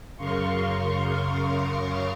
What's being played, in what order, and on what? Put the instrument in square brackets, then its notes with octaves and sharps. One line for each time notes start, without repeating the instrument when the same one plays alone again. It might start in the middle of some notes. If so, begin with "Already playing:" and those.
[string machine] F#2 C#3 A#4 F5 C6 C#6